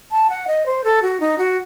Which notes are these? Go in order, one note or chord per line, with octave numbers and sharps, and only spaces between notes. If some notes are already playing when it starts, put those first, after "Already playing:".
A5
F#5
D#5
C5
A4
F#4
D#4
F#4